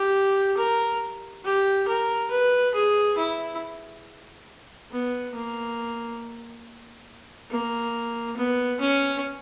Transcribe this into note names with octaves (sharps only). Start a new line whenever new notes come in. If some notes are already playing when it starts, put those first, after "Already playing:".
Already playing: G4
A#4
G4
A#4
B4
G#4
E4
B3
A#3
A#3
B3
C#4